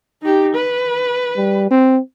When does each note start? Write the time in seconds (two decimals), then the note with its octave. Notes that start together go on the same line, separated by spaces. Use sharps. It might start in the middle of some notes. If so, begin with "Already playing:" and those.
0.23 D#4 G4
0.55 B4
1.37 G3
1.71 C4